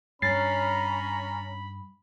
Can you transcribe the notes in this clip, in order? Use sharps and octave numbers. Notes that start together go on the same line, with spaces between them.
G2 C#4 A#5 B5 A6 C7